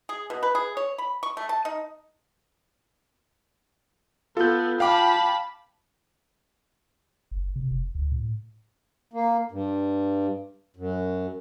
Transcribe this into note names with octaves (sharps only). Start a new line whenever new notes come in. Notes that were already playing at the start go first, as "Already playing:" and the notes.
G#4
B2
B4
G#4
C#5
B5
C#6
A3
A5
D#4
B3 F4 A4 G6
F5 G5 A5 B5 D6
F#1
C3
F1
D2
A2
A#3
G2
F#2